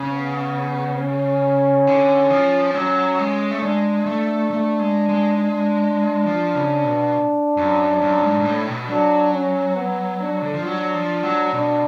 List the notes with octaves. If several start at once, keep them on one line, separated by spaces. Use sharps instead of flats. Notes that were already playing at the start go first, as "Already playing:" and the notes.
Already playing: C#3
B3
C#4
D3
F3
F#3 C#4
G#3
A3
G#3 D4
A3
A3
G#3
G#3
D4
F3
C#3
B2
F#2
F#2
G#2
G#2
A2
B2
F#3 D4
C#4
B3
D4
D3
F3
F#3 D4
F3
F#3
B2 D4